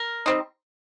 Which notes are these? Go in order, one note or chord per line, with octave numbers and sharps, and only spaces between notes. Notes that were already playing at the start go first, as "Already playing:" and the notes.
Already playing: A#4
G3 C4 D#4